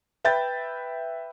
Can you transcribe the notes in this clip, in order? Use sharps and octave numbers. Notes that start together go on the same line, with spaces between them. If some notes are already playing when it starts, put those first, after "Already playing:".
B4 E5 G5 B5 G6 A6